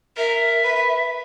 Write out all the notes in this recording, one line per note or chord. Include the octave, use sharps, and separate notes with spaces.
A#4 E5
B4